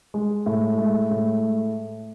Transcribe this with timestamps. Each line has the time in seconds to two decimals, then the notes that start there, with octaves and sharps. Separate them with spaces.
0.14 G#3
0.46 A2
0.78 G#3
1.11 A2